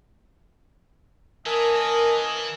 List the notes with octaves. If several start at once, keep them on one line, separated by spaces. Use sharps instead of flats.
E3 A#3 C#4 A#4 D#5 G#5 A5